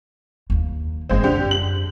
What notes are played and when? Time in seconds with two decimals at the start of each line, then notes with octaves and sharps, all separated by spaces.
0.50 D#2 A#3
1.09 G1 G#3 A3 C4
1.23 F#2 D3 G4
1.51 F#7